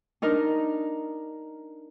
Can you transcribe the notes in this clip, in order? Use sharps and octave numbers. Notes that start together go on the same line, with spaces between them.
D4 D#4 A#4